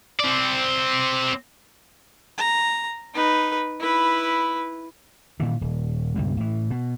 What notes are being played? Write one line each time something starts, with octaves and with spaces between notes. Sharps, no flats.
C4 D5
A#5
D#4 B4
E4 B4
A#2 D#3 E3
D#1
C#2 G2 B2
A2 E3
B2